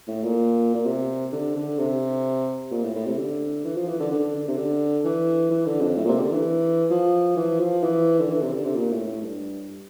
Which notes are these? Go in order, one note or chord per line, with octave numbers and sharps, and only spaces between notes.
A2
A#2
A#2
C3
D3
D3
C3
A#2
A2
A2
C3
D3
E3
F3
E3
D3
D3
D3
C3
D3
E3
E3
D3
F2
A2
A#2
C3
D3
E3
F3
E3
F3
E3
D3
E3
C3
D3
C3
A#2
A2
A2
G2